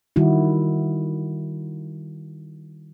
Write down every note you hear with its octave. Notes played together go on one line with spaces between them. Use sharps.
D#3 G3 E4 F#4